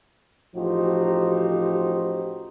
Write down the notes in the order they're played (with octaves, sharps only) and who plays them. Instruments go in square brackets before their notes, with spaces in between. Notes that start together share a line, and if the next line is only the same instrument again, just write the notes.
[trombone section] A1 F3 D#4 F#4 G4 C5